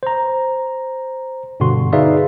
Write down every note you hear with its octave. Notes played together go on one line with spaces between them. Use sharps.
C5 A#5
G2 B2 D3 F#4 C6
D#4 G#4 B4 D5 E5 F5